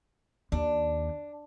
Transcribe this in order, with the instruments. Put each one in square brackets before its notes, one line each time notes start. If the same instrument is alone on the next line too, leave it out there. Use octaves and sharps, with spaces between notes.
[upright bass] D#2 [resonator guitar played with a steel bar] D4